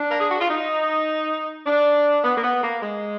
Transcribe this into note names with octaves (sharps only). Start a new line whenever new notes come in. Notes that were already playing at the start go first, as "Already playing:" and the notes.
Already playing: D4
A#4
G#4
F#4
F4
D#4
D4
B3
A#3
B3
A#3
G#3